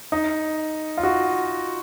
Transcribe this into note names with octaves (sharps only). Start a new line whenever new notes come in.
D#4
F4
F#4